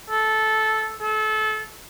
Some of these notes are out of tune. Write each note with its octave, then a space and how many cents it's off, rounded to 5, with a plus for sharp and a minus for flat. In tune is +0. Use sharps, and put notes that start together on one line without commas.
A4 -15
A4 -30